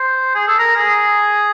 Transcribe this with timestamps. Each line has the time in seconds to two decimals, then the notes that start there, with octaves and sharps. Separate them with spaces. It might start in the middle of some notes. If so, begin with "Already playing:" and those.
Already playing: C5
0.35 G#4
0.48 A4
0.59 A#4
0.77 G#4